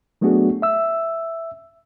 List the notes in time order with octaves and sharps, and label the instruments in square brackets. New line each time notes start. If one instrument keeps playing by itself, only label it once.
[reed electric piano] F#3 A3 B3 D4 F#4 G#4
E5 E6